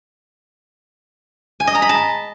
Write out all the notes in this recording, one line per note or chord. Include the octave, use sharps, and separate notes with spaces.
G#5
D#5
A#5
B5
A5